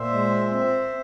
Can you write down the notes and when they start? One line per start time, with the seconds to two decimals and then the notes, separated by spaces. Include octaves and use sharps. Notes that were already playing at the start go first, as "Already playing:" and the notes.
Already playing: A#2 C5 E5
0.12 G#3
0.51 C4